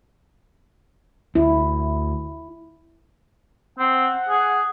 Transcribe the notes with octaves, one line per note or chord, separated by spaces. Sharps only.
D2 E4
C4 F#5
G#4